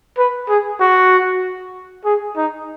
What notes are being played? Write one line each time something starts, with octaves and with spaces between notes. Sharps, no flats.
B4
G#4
F#4
G#4
D#4